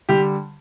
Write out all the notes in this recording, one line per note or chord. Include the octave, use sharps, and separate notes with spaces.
D3 G3 G4